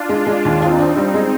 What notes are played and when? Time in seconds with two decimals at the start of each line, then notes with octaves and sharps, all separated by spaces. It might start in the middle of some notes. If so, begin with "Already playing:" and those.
Already playing: D4 F4
0.09 G#3
0.27 G#3
0.45 D#2
0.61 C4 D#4 F4
0.79 D4
0.97 G3
1.14 G#3